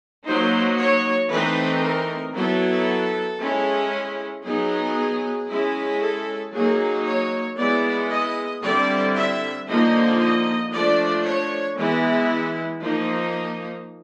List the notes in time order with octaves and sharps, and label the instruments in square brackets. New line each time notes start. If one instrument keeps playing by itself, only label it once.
[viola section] F#3 A#3 D#4 C5
C#5
E3 A3 C4 D#4 B4
A#4
F#3 B3 E4 A4
G#3 C#4 E4
F#3 B3 D#4 G#4
G#3 C#4 E4
A4
F#3 A#3 D#4 G#4
C#5
G#3 B3 E4 D5
D#5
D3 G3 C4 E4 D5
E5
D3 F3 A#3 D#4 D#5
D#5
F3 A3 D4 D5
C#5
E3 G#3 B3 E4
F3 A#3 D#4